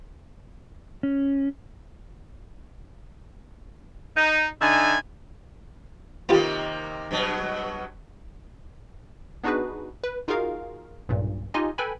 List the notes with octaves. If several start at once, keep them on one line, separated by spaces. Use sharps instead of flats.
C#4
D#4
D3 D#4 E5 G#5
C3 D#3 A#3 B3 F4 G4
G2 B2 F#3
B3 D4 D#4 F#4 G#4 B4
B4
D#4 F4 F#4 G#4 A#4 F5
B1 G2 A#2
D#4 F4 G4 D#5 G#5
A4 B4 G5 G#5 B5